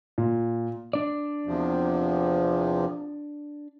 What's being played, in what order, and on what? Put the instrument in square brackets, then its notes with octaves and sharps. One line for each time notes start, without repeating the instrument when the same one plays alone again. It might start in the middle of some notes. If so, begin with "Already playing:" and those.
[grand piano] A#2
[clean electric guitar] D4 D5
[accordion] E2 C3 F3